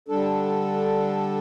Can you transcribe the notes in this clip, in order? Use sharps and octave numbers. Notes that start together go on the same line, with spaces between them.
D3 G3 D4 A4